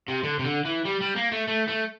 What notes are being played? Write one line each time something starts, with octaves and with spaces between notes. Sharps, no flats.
C3
D3
C3
D3
E3
G3
G3
A#3
A3
A3
A3